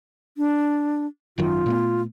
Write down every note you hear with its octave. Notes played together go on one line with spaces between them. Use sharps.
D4
G#1 F#2 D#3 F4
A#2 A3 B3